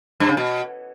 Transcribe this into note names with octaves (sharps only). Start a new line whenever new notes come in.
G2
C#3
B2